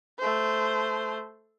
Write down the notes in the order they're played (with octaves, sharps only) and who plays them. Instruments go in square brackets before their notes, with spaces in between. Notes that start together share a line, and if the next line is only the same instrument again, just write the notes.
[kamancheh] A3 C5